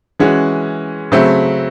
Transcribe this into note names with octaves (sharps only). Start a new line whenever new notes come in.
E3 G#3 C#4 F#4
C#3 F#3 A3 C4